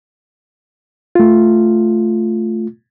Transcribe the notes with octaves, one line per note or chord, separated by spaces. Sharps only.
A3 F4